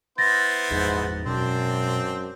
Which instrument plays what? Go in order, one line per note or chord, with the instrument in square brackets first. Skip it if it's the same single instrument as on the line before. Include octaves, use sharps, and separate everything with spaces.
[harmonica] B3 E4 C5 [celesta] A6 A#6
[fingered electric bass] E2 F3 G#3 [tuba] G#2
[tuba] F#2 [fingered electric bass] B2 G#3 [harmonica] C4 D4 C5